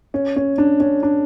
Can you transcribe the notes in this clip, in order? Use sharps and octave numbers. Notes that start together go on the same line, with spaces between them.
C#4
C#4
D4
C#4
D4